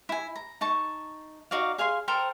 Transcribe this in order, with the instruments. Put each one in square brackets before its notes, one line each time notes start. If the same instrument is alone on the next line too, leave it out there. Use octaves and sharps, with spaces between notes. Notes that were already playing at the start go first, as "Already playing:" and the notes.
[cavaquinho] E4 G#5
A#5
D#4 A5 C#6
D#4 F#4 D5 F5
G#4 F5 G#5 C6
A4 A#4 C5 G5